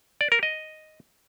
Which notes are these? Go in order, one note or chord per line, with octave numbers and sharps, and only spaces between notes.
D5
A#4
D#5